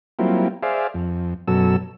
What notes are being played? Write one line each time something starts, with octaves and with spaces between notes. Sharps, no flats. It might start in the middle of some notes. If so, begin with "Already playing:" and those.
F#3 G3 A#3 C4 E4 F4
G#4 C5 D5 E5 F5
F2
F#2 B2 F#3 A4 E6